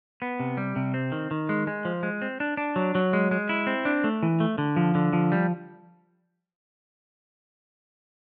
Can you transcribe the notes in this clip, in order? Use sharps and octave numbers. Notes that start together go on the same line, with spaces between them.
B3
C3
G3
C3
C4
D#3
D#3
G#3
G#3
F3
G#3
C4
D4
D4
F#3
F#3
G#3
G#3
E4
C4
D4
A3
E3
A3
D3
F3
D3
F3
G3